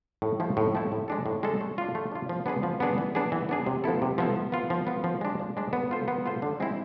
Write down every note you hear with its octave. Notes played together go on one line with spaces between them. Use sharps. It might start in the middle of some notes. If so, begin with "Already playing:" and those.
A2
F3 A3 E4
A2
F3 A3 E4
A2
G#3 D4 A4
A2
G#3 D4 A4
A3
D4 F4
A3
D4 F4
F3
B3 D4 G#4 B4
F3
B3 D4 G#4 B4
E3
B3 D4 G#4
E3
B3 D4 G#4
C3
F3 B3 E4 A4
C3
F3 B3 E4 A4
F3
B3 F4
F3
B3 F4
F3
G#3 D4
F3
G#3 D4
B3
F4 A4 C5
B3
F4 A4 C5
D3
G#3 C4 E4